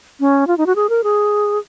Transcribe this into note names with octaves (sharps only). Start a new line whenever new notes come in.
C#4
F4
D#4
F#4
G#4
A#4
G#4